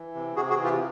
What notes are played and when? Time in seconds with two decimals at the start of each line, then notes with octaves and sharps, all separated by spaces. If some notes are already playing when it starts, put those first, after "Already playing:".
Already playing: E3
0.15 C3
0.36 C3 F#4 G#4
0.50 F#4 G#4
0.57 E3
0.64 F4 G4